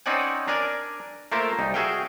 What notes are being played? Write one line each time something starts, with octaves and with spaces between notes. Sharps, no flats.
C4 C#4 D#4 D5 F#5 G#5
D4 A#4 D5 G#5
A3 A#3 F4 A#4 C5 E5
C2 D#4
F#4 G#4 E5 F5 G5